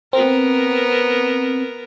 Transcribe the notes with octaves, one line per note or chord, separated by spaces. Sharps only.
B3 C4 A#4